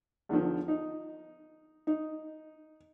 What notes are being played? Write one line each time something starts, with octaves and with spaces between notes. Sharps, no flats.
E2 D3 D#3 F3
D#4
D#4